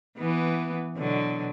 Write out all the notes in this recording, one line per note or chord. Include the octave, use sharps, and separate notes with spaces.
E3 B3
B2 D3 F#3